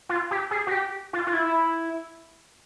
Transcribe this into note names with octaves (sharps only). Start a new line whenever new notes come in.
F4
G4
G#4
F#4
G4
F4
F4
E4